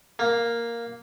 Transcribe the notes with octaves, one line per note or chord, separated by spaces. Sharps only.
A#3